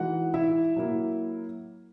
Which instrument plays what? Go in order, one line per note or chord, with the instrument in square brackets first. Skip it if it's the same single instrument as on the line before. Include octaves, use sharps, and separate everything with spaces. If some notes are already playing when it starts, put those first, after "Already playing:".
Already playing: [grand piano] E3 G#3 D#4 F#4 F#5
E4 E5
F#3 A#3 E4